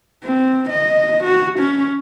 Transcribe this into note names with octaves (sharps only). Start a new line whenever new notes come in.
C4
D#5
F#4
C#4